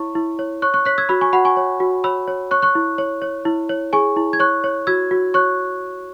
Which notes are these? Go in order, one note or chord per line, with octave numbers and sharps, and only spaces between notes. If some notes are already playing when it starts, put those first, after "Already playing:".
Already playing: E4 C#5 C#6
E4
C#5
C#5 C#6 F#6
C#6 F#6
C#5 F#6 B6
E6 G#6
F#4 B5 E6
G#5 C#6
F#4 F#5 B5
G#5 C#6
C#5
F#4
C#5 B5 E6
C#5
C#5 C#6 F#6
C#6 F#6
E4
C#5
C#5
E4
C#5
G#4 G#5 C#6
E4
G#6
C#5 C#6 F#6
C#5
F#4 E6 G#6
F#4
C#5 C#6 F#6